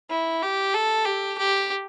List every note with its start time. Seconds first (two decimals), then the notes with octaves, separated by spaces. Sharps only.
0.10 E4
0.42 G4
0.74 A4
1.05 G4
1.38 G4